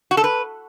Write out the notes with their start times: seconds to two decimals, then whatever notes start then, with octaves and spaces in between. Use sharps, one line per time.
0.11 F#4
0.17 A4
0.24 B4